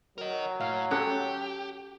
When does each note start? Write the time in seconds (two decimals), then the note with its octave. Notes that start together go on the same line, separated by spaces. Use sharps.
0.18 F#3 A#4 D#5
0.61 A2 F5
0.91 C#4 G4 A4 F#5